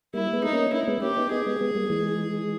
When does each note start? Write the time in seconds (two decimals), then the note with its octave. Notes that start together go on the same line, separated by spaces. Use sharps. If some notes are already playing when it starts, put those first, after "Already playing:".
0.14 G3 A#3 E4
0.33 G#3 B3
0.44 D#4
0.53 A#3 C#4
0.73 A#3 C#4 E4
0.87 G#3 B3
1.02 A#3 C#4 G4
1.17 B3 D#4
1.32 B3 D#4 G#4
1.46 G#3 B3
1.60 G#3 B3
1.75 G3 A#3
1.90 E3 G#3